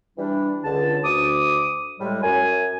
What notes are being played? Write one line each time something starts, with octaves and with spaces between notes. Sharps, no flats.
E3 G3 D4
C#2 D3 A5
D2 D6 D#6
A2 G3 G#3
F#2 G#5